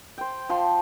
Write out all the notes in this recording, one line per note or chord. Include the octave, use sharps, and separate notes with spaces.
C5 G5
F3 C6